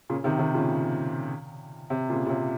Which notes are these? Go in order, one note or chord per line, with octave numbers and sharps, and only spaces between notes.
A#2 C#3
C3 D#3
C3 D#3
A#2 C#3
C3
A#2 C#3
A#2
C3